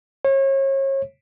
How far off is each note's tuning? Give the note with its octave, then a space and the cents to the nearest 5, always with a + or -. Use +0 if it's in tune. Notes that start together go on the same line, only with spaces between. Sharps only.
C#5 -35